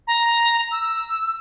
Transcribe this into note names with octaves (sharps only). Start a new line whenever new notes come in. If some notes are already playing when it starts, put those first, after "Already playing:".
A#5
E6